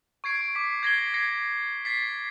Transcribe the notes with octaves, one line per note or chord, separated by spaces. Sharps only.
C#6 G#6 C7 D7
D6 B6
G#6 A#6 C7 G7
G#6 A#6 C7 C#7
A6 B6 C7